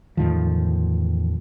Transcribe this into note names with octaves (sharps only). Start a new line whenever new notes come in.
E2 A2 D#3 F3